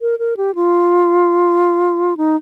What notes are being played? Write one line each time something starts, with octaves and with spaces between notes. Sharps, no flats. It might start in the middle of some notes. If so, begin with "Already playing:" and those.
A#4
A#4
G4
F4
D#4